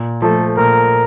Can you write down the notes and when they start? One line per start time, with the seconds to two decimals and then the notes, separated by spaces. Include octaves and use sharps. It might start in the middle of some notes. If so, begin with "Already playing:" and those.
Already playing: A#2
0.22 F3 A3 A4
0.57 A#2 A#4